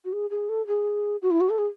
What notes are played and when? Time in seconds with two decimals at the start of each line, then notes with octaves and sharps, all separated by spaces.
0.05 F#4
0.13 G#4
0.30 G#4
0.49 A4
0.67 G#4
1.22 F#4
1.31 E4
1.40 F#4
1.50 A4
1.58 G#4